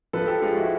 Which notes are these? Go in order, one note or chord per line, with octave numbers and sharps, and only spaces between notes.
F3 A4 B4
G4 A4
G#3 F4 G4
E4 F#4